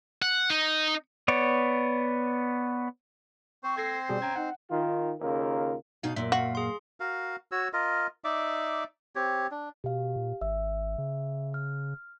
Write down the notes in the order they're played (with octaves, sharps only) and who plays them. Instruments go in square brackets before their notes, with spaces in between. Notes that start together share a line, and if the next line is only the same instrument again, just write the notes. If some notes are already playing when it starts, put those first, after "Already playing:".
[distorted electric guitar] F#5
D#4
[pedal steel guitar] B3 C#5 D5
[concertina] C4 C5 [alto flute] C#6
[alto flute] A4 [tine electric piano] G#6 A#6 C7
[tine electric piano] B2 G3 G#4 [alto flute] D5
[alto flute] C#4 [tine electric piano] G5 A#5 G#6
[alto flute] D#4 [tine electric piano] F#5
[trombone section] D#3 F4
D#2 C#3 F4 A#4
[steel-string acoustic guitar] B2 D#4 F5
[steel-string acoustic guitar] F#2 A#2 [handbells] E5
[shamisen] F#4 [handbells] F5
[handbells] G#4 C6
[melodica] F#4 A#4 F5
F#4 C#5 E6
F4 A#4 D#5
D#4 D5 E5 D6
C4 G4 C#5
D4
[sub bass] B2 [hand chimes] G4 F5
[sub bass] A#2
[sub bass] G#1 [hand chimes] E5 E6
[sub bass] C#3
[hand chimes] F6